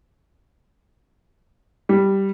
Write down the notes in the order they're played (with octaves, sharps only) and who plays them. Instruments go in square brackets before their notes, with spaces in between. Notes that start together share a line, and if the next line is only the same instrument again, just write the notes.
[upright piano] G3